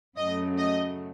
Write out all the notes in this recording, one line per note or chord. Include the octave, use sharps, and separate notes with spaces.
F#2 C#3 F#3 A3 D#5
D#5